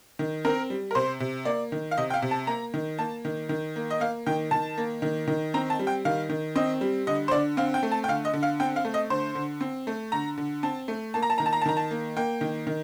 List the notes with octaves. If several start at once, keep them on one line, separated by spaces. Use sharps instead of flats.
D#3
C4 A#4
G3
A#4
C3 C5
C3
A#3 D5
D#3
F5
C3 D#5
G5
F5
C3
A5
A#3 A#5
D#3
A#3 A5
D#3
D#3
A#3
D#5
A#3 F5
D#3 G5
D#3 A5
A#3
D#3
D#3
C4 A#5
A5
G3
G5
D#3 F5
D#3
C4 D#5
G3
D3 D#5
C5
D3 D5
C4 F5
G5
A3
A5
G5
D3 F5
D#5
D3
F5
C4 G5
F5
A3
D#5
D3 C5
D3
C4
A3
D3 A#5
D3
C4 A5
A3
A#3 A5
A#5
A5
D#3 A#5
A5
A#5
A5
D#3 A#5
A5
A#3
A#3 G5
D#3
D#3